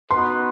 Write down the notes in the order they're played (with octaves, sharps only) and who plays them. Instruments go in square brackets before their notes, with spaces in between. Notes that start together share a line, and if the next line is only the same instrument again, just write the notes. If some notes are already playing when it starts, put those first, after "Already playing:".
[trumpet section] B3 D#4 F#4 B4 [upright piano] C6